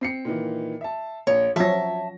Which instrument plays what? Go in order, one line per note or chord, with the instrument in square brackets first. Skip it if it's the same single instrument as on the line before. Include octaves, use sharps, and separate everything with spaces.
[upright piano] C4 C7 C#7
A#2 D#3 E3
E5 A5
[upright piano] A#1 [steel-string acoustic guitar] C#5
[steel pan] F3 F#3 C#4 [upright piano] C#5 A#6 [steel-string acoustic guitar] E5 A5